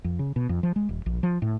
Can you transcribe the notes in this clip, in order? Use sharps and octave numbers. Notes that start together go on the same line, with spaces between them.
F2
C#3
B2
F2
F3
G#3
D#1
A#1
F3
A2